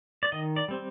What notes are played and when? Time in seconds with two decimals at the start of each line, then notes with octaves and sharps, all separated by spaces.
0.23 D5
0.32 D#3 D#5
0.56 D5
0.68 G3 C4